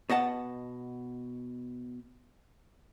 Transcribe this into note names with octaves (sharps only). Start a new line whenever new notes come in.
B2 D#5 F#5 A5